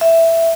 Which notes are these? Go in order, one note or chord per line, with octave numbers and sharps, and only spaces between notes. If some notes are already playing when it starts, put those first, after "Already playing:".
E5